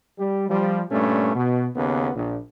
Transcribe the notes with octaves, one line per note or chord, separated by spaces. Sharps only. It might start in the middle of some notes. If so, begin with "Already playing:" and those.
G3
F3 G3
G2 A#2 A3 C#4
B2
D#2 C#3 B3
A#1